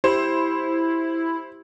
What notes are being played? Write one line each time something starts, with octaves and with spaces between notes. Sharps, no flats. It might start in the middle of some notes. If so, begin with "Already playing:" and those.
E4 G4 C5